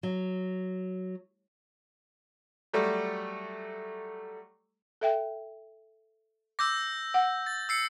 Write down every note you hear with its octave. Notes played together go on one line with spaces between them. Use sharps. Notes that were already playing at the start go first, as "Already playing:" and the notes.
F#3
F#3 G3 A3
A4 E5 G5
D6 E6 G6 A#6
F#5
A6
E6 C7 C#7